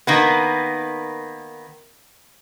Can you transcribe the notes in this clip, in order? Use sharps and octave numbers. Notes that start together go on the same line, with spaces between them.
D#3 A#3 B3